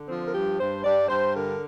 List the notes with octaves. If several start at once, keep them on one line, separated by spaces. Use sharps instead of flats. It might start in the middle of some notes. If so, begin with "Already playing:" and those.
Already playing: D3
F3 C4
A#4
G2 G4
G2 C5
G2 D5
G2 C5
D3 A#4